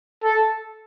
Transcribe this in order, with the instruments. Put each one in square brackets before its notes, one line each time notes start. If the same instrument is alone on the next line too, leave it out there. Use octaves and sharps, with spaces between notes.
[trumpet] A4